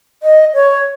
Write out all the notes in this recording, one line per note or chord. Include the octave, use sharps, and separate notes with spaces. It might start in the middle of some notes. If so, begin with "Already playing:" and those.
D#5
C#5